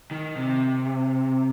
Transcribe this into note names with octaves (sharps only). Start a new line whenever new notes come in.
D#3
C3